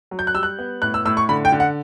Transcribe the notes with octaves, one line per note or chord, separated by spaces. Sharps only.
F#3
G6
F#6
G3 E6
F#6
B3
A2 F#6
E6
A2 E6
C#6
D3 B5
G5
D3
F#5